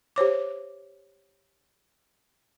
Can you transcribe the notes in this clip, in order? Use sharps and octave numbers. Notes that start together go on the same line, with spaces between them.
G4 C5 C#5 D6